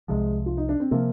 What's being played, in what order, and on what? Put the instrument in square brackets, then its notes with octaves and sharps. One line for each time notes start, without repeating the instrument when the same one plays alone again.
[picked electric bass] C2 C3 F3 [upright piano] G#3
[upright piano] F4
D#4
D4
C4
[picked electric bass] C3 F3 [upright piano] A#3